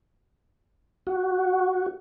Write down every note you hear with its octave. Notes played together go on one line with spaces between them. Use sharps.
F#4